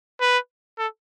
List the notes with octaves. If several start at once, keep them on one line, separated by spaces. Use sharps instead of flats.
B4
A4